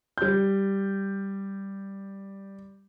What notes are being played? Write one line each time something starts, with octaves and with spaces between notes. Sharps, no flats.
G3 G6